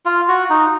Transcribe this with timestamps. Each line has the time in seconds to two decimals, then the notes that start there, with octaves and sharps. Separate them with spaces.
0.06 F4
0.28 F#4
0.50 D#4